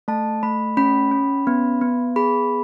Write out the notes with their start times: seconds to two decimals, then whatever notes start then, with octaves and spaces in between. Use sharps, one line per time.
0.08 A3 A5
0.43 A3 B5
0.77 C#4 B5
1.11 C#4
1.47 B3
1.81 B3
2.16 G#4 B5